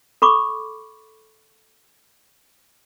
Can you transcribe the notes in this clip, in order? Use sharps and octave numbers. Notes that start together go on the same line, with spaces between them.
A4 B5 C#6 D6